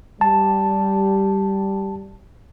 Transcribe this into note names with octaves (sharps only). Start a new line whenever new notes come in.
G3 A5